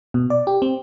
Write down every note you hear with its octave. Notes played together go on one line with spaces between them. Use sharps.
B2
D5
G4
C4